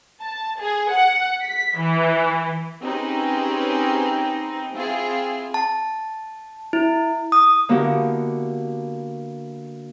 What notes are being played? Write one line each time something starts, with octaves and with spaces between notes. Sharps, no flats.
A5
G#4
F#5
B6
E3
C4 C#4 D#4 G4 G#4 B4
C4 E4 F4 G#4
A5
E4
D#6
D3 A#3 B3 E4 F#4 G4